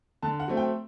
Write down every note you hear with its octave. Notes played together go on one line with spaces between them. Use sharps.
D3 A5
F#5
F#3 A3 C4
G5